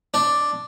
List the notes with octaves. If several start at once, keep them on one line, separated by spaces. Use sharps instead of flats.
D4